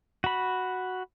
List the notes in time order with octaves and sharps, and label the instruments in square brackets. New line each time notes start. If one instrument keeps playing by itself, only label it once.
[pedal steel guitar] F#4 B5